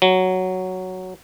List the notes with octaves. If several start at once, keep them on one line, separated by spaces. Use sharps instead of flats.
F#3